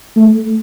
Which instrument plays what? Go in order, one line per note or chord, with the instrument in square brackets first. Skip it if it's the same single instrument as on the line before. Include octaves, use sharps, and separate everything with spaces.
[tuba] A3